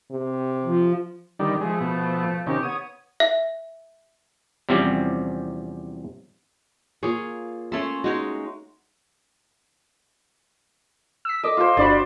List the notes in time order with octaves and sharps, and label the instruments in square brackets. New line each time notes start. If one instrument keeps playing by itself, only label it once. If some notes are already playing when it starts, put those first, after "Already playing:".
[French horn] C3
[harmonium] F3
[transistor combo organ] D3 D#3 G3
[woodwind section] F3 A3 [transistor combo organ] G#3
[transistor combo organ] B2
[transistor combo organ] C3 D#3 C#4 [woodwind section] G4
[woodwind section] B3 C#5 [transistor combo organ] D#6
[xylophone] E5
[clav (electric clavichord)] E2 C3 F3 G3 C4 C#4
[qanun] A#3 F4 [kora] G#4 C#5
[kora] A3 A4 E5 [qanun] C#4 C6
[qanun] G#3 D#4 C#5 [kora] F#4
[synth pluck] E6 B6
[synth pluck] A4 D6 [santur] D#5
[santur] F4 C5
[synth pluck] G1 D4 B5 [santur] F#4 C5 D5